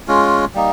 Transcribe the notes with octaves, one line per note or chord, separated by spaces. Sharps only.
G#3 C#4 F4
G3 A#3 D#4